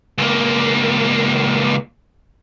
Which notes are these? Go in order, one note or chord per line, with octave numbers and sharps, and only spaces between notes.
C#2 A#3